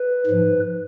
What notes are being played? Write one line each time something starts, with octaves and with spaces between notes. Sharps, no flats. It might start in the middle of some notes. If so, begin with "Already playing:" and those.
Already playing: B4
G#2 F3